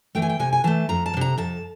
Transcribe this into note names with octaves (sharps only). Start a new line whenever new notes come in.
E3 A3 G5
G#5
G5
C3 G#5
G#5
E3 A3 A5
F2 A#5
A5
F3
C3 A#5
F2 A5